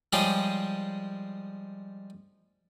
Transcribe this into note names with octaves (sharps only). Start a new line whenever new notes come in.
F3 G3 G#3 G4 G#4 C#5